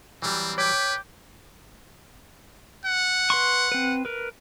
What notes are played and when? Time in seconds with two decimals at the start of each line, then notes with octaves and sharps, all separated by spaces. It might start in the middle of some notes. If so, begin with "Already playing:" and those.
0.22 E3 F#3 G3 C4
0.58 B4 C#5 G5 D6 B6
2.85 F#5
3.30 B4 C6 C#6
3.72 C4 B4
4.05 A#4 B4